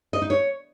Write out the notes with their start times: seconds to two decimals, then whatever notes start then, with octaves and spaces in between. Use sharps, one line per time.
0.13 D#5
0.22 D#4
0.30 C#5